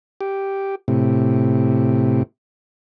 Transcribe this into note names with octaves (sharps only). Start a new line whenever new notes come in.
G4
A2 C3